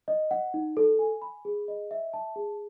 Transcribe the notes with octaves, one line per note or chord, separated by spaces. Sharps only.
D#5
F#5
D#4
A4
G#5
B5
G#4
D#5
E5
A5
G#4